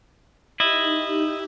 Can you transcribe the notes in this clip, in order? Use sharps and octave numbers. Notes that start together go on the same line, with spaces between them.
D#4 E4 G4 D#5